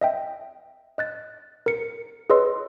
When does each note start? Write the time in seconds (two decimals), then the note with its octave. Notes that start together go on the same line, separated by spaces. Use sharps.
0.01 D#5 E5 G5
0.98 D#5 F#6 A6
1.66 A#4 C#7
2.30 G#4 B4 C#5 D#5 C6 E6